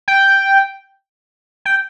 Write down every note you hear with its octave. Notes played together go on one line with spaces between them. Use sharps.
G5
G5